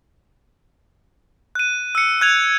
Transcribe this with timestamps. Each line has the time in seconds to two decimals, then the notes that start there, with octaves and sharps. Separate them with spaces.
1.55 F#6 D#7
1.95 E6 C#7
2.21 F#6 G#6 F7